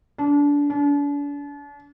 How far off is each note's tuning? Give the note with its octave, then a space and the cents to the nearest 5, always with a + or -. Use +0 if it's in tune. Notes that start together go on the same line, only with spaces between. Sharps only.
D4 -25
D4 -40